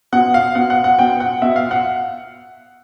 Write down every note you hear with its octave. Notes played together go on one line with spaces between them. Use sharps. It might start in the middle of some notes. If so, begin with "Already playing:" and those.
B2 F#5
F5
B2 F#5
F#5
F#5
B2 G5
F#5
B2 E5
F5
F#5